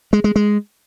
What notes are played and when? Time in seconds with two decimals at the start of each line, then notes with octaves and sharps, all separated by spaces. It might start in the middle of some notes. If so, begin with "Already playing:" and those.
0.13 G#3
0.24 G#3
0.36 G#3